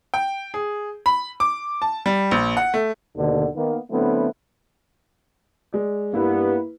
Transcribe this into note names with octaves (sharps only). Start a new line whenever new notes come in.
G5
G#4
B5
D6
A5
G3
A#1
F#5
A3
D#2 B2 D3
D#3 A#3 B3
D3 F#3 A3 B3 C4 E4
G#3 D5
G2 A#3 B3 E4 B4